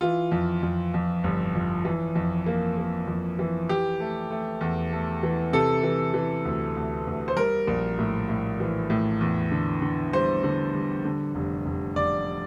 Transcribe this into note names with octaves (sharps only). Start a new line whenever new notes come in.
E3 F4
F2
F2
F2
G1
F2
E3
F2
A#3
A#3
F2
E3
E3 G4
A3
A3
E2
A3
E3
C3 A4
E3
E3
D2
D2
D2
C5
G3 A#4
A#1
A2
A2
E3
A2
E2
D3
D3
G3 C5
D3
G3
D3
F1
F1
F1 D5